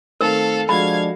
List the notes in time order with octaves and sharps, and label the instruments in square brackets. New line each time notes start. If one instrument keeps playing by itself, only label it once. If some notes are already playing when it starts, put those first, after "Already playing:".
[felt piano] D#3 A3 C4 [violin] A4 F5 [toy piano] A#4
[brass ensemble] F3 G#3 D4 [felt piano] F#4 A4 [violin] F5 G#6 [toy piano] B5